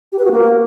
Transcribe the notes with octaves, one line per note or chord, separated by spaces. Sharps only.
G4
B4
F#4
A#3